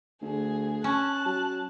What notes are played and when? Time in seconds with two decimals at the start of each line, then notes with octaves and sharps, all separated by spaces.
0.22 D2 G#4
0.84 C#4 A5 F#6
1.26 F#3